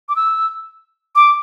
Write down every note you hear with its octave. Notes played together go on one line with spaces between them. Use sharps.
D6
E6
D6